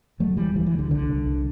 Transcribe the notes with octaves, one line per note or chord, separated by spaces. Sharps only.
E2 F#3 A3
E2 E3 G3
D2 E3 G3
E3
D2
D3
C2 D3
C2
C2